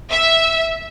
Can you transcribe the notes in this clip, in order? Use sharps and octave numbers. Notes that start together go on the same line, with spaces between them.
E5